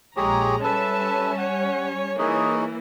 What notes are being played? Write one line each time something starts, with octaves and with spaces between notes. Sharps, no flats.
A#1 G#3 G4 G#4 C#5 A#5
G3 C#4 A4 B4 E5 A5
C#5 F#5
E3 A#3 D#4 G#4 C#5